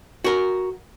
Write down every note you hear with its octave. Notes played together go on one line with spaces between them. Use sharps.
F#4 A#4